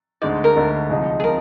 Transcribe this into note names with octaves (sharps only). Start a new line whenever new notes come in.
D2 D3 G#3 D#4 D5
A#4
D2 D3 G#3 D#4
C2 C3 F3 G#3 D#4
G#4
C3 F3 A#4